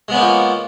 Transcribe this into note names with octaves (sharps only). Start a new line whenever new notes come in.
F3 G#3 A#3 B3 C#4